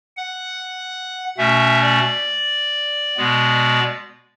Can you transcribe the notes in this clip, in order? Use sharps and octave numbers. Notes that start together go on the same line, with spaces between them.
F#5
B2 A3 C#4 E5
D5
B2 G#3 B3